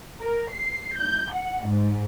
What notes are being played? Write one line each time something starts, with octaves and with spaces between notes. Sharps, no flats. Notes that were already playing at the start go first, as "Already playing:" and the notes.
A#4
C7
G6
F#5
G#2